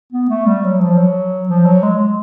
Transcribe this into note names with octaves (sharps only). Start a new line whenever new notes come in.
B3
A3
G3
F#3
F3
F#3
F3
F#3
G#3